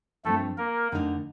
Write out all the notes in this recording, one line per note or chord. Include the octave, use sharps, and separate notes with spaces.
G2 F3 A3 C4 A4
A#3 A#4
F2 D3 A3 D#4 A#4